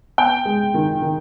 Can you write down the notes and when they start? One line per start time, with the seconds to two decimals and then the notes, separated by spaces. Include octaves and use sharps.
0.18 B3 G5
0.45 G#3
0.74 D#3
1.02 D#3